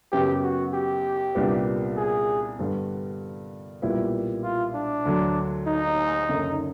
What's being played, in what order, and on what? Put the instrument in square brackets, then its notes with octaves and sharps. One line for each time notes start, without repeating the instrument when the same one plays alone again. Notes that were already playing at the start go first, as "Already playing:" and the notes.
[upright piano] F#2 C#3 F#3 B3 [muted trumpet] G4
[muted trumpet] F#4
G4
[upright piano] C2 A#2 G3 B3 D4
[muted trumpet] G#4
[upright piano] G2 D3 G3 B3
B1 A#2 G3 B3 E4
[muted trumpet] F4
D4
[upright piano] D2 D3 F#3
[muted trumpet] D#4
[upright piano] F#1 F#2 D3